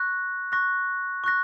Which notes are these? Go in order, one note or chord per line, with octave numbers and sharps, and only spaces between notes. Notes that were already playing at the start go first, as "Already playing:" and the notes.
Already playing: C#6 F#6 A#6
C#6 F#6 A#6
C#6 F#6 A#6